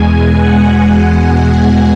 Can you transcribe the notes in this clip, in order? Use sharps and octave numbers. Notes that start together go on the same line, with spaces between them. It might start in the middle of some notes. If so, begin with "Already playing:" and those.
Already playing: E2 B2 G#3 G#5
F#5
G#5